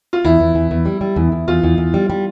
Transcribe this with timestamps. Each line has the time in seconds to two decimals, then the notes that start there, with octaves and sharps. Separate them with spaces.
0.13 F4
0.24 E2 E4
0.40 E2
0.55 E2
0.71 E2
0.86 G3
1.01 G3
1.16 E2
1.32 E2
1.48 E2 F4
1.63 E2
1.78 E2
1.94 G3
2.10 G3